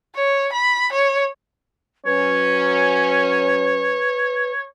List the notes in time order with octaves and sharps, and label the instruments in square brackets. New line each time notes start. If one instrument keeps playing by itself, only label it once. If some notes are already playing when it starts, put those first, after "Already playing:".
[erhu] C#5
B5
C#5
[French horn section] F#3 C#4 [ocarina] B4 [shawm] C#5